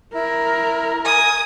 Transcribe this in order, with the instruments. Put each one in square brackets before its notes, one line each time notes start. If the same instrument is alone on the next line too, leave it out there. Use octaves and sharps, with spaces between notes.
[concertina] E4 [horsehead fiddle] A#4
[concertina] G#5 [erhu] D#6